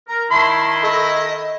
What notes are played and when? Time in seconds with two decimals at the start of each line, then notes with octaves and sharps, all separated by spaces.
0.08 A#4 A#5
0.31 D#3 E4 E5 A5 C6
0.83 A4 D#5